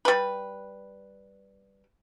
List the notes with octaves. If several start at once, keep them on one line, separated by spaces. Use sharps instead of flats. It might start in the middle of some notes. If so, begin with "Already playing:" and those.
G3 B4